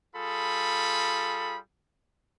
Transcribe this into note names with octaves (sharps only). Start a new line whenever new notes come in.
G3 F4 G#4 A4 B5